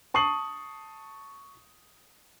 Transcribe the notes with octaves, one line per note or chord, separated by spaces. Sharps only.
A5 C#6 D#6 C7 F#7